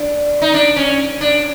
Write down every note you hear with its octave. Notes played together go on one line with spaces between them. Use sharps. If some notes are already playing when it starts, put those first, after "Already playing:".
Already playing: D4
D#4
D4
C#4
D4